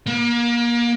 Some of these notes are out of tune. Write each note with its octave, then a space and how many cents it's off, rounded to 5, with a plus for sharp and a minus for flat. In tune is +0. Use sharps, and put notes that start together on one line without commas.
A#3 +30